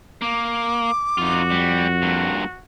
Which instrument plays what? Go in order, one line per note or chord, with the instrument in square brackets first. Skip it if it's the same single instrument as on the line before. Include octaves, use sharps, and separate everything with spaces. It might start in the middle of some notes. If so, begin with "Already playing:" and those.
[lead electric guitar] A#3 [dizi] D6
[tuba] F2 [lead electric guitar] D#4 F4 [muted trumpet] F#4
[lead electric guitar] G3
G2 A#2